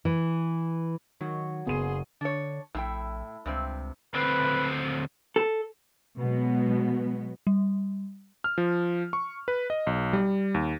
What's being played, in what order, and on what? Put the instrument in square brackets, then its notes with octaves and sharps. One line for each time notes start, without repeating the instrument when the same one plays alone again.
[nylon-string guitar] E3
[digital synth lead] D#3 [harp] F#3
[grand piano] F#1 D#7 [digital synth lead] B3 [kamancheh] G#4 C6
[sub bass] D3 [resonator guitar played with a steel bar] D4 C#5
[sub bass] A#1 [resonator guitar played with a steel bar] A2 E4 G5
[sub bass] C#2 [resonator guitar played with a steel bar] G2 C3 C4
[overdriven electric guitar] D2 C4 [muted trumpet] B4
[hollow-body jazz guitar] A4
[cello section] B2 F#3 G#3 B3
[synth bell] G3
[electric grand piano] F6
F3
C#6
B4
D#5
B1
G3
D#2